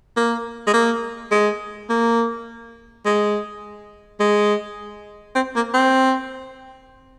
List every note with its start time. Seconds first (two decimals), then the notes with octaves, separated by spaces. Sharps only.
0.17 A#3
0.67 G#3
0.74 A#3
1.31 G#3
1.89 A#3
3.05 G#3
4.20 G#3
5.35 C4
5.56 A#3
5.74 C4